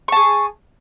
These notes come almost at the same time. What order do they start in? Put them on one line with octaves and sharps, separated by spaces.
C#6 A5 G#4